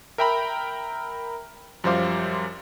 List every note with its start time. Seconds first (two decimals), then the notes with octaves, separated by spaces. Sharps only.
0.18 A#4 E5 G5 A#5 B5
1.84 F#2 F3 G3 C5 F5 D6